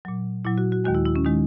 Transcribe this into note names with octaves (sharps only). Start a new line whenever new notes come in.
A#2 F#3
A#2 F#3 E4
F#4
F#4
D#2 D#3 G#3 F#4
E4
E4
C#4
D#3 G#3 D#4